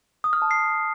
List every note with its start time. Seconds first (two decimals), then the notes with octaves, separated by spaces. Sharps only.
0.24 D#6
0.33 F6
0.42 A5
0.51 C7